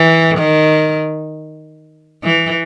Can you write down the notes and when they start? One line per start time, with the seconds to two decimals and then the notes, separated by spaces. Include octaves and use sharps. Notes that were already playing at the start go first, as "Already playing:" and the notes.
Already playing: E3
0.38 D#3
2.24 E3